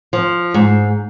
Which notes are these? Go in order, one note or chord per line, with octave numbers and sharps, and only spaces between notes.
F3
G#2